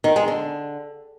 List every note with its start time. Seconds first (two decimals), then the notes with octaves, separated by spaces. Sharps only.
0.04 D#3
0.16 G#3
0.28 D3